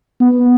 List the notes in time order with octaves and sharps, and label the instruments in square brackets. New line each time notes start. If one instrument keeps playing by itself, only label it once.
[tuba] B3